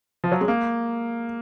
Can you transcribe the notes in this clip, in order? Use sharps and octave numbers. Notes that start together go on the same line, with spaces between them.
F3
F#3
G#3
A#3